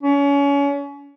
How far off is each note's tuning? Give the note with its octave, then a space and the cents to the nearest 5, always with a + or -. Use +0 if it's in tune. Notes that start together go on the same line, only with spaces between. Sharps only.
C#4 +30